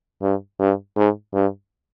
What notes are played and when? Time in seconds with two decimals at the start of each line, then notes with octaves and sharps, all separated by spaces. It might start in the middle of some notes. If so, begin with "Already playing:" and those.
0.22 G2
0.60 G2
0.96 G#2
1.34 G2